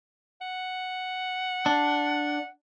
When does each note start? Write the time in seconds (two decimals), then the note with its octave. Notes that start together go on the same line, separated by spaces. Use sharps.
0.41 F#5
1.66 D4